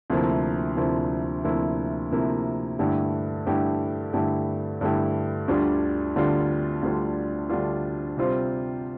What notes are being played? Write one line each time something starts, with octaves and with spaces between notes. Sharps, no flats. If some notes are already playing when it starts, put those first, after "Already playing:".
D2 C3 F3 A#3 E4
D2 C3 F3 A#3 E4
D2 C3 F3 A#3 E4
D2 C3 F3 A#3 E4
G2 D3 A3 E4 G4
G2 D3 A3 E4 G4
G2 D3 A3 E4 G4
G2 D3 A3 E4 G4
D2 D3 G3 D4 F4
D2 D3 G3 D4 F4
D2 D3 G3 D4 F4
D2 D3 G3 D4 F4
C3 G3 C4 F4 C5